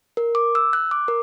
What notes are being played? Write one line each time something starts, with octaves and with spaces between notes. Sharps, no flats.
A#4
D6
E6
F#6
D6
A#4